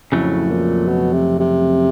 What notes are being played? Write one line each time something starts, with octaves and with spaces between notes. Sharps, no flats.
F2 A2 C#3 F#3 A3
A#2
B2
C3
C3